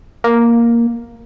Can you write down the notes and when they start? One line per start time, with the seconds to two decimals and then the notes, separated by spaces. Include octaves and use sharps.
0.24 A#3